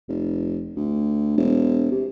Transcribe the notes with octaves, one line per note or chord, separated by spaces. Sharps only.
F1
D2
E1
C3